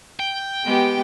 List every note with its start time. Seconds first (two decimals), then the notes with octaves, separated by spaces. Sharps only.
0.20 G5
0.64 G#3 B3 G4